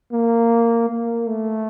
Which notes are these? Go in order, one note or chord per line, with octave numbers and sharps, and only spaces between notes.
A#3
A#3
A3